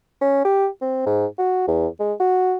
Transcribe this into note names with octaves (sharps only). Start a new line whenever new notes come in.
C#4
G4
C4
G#2
F#4
E2
G#3
F#4